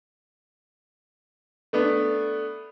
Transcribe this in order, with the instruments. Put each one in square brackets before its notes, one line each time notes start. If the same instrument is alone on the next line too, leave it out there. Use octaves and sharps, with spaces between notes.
[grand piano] A3 B3 D4